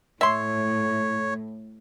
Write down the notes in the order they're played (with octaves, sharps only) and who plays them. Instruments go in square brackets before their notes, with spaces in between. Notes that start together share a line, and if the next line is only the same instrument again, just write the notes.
[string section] A2 [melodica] C#5 [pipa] E5 C6